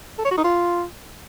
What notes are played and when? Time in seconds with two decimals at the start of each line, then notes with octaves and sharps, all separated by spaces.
0.18 A4
0.25 C#5
0.31 F#4
0.38 D#4
0.44 F4